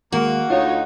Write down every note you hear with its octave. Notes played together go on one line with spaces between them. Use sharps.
D#2 G#3 A#3 F#4
D2 D#4 F4 C#5